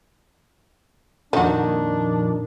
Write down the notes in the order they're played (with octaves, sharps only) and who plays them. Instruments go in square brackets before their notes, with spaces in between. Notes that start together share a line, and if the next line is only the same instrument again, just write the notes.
[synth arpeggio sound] F2 A#2 [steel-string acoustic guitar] D#3 [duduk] D4 [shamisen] D#4 F#4